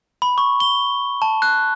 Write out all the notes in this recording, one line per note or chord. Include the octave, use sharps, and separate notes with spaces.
B5
C#6
G7
A5
F#6